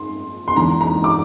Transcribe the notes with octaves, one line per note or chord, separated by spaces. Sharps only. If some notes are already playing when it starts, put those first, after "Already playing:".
Already playing: C6
C6
E2 D3 A#5
A#5
D6